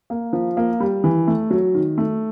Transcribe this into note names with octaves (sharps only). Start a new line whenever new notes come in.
A#3
F3
A#3
G3
E3
A3
F#3
D#3
A3